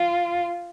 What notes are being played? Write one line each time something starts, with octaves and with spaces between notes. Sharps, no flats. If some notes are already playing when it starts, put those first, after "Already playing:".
Already playing: F4